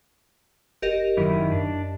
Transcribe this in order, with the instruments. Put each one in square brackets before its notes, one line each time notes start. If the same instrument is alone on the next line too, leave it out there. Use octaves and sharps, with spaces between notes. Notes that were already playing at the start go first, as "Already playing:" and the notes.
[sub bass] F1 [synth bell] G4 A#4 D#5
[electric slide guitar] F#2 D#3 E4
[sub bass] F#2 [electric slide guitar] D4